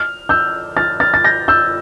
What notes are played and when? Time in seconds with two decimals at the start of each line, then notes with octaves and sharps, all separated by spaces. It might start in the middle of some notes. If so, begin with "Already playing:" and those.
Already playing: F6
0.29 E6 G6
0.77 F6 A6
1.00 F6 A6
1.14 A6
1.24 G6 A#6
1.48 E6 G6